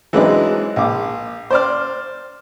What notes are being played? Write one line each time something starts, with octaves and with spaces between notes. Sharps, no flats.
E3 F#3 G#3 C4 D4 D#4
A#1 D6
C5 D5 F6